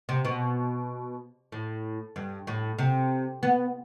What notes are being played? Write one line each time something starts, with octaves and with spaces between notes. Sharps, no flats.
C3
B2
A2
G2
A2
C3
B3